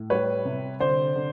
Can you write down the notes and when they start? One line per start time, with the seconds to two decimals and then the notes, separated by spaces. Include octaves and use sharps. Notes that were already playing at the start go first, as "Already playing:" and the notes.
Already playing: A2
0.10 G3 B4 C#5
0.45 C3
0.80 D3 C5 D5
1.16 D3